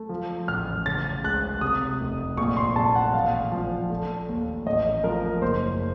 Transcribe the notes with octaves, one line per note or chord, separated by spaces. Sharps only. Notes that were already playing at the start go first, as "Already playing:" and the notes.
Already playing: A3
F3
A1 F6
C#3 A6
C#2 F#6
C3 D#6
F1
A#1 C#6
C6
A#1 A5
F#5
A1 F5
F3
A3
D#2
A1 D#5
F3 A#4
F#1 C5